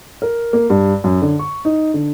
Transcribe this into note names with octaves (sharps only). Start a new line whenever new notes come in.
A#4
A#3
G2
F#2
D3
C#6
D#4
D3